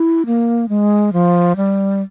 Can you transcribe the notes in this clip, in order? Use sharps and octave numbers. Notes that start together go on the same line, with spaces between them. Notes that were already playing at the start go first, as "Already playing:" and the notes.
Already playing: E4
A#3
G#3
F3
G3